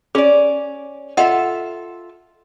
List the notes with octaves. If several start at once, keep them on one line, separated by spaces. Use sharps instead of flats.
C#4 G#4 D5
F4 A4 D#5 E5 F#5